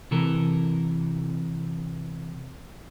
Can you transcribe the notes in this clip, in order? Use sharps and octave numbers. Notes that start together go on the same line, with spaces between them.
C3 E3 A4 A#4